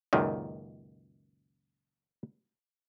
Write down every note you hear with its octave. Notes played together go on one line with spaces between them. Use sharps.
C#2 F#2 A#2 D#3